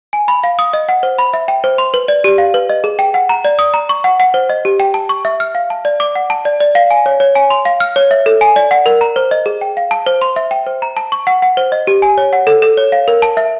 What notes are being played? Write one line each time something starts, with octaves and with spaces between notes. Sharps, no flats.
G#5
B5
F5
D#6
D#5
F#5
C5
B5
E5
G5
C5
C6
B4
D5
G4
F5
B4
D#5
G#4
G5
F#5
A#5
D5
D#6
A#5
C#6
F#5
F#5
C5
D#5
G4
G5
A5
C#6
E5
F6
F5
A5
D5
D6
F#5
A5
D5
D5
F5
G#5
C#5
C#5
G#5
C6
F5
F6
C#5
E5
A4
G#5
D5
F#5
A#4
A#5
C5
D#5
G#4
G5
F5
A5
C5
C6
E5
G5
C5
A#5
A5
C#6
F#5
F#5
C5
D#5
G4
G#5
C#5
F#5
A4
A4
C#5
F5
A#4
A5
E5